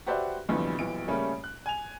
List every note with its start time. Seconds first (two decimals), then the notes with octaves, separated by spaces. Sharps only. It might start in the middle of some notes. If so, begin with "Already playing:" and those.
0.07 F#4 G4 B4 C5 D5 E5
0.49 B1 F2 A#2 D3 E3 G3
0.79 D#1 B1 E3 D7
1.08 C#3 G3 A3 A#3 C#4
1.44 F#6
1.66 G#5 F7